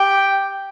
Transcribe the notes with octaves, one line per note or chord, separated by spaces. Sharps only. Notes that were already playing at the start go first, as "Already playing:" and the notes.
Already playing: G4 G5